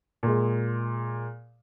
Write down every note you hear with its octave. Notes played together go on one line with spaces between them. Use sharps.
A#2 G#3